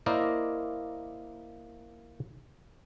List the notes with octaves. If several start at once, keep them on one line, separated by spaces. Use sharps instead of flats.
A#3 E4 A#4 C5 D5 D#5